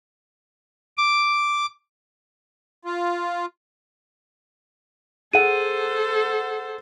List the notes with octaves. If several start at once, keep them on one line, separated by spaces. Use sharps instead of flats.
D6
F4
G#4 A4 C5 F#5 D#7